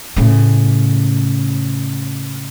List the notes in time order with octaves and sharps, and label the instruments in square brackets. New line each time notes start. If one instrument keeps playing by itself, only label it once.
[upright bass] A2 C#3